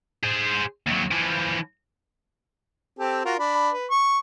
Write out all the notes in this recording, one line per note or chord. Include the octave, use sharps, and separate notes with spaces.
G#4 C5
D#2 F#3
E3 F3
C4 G4 A4
F4 F#4 A#4
D4 B5
B4
C#6